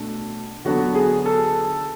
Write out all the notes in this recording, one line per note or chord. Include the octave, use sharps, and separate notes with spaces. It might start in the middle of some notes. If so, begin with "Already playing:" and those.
Already playing: B2 A3 D4
D3 F#3 B3 D4 F#4
G#4
A4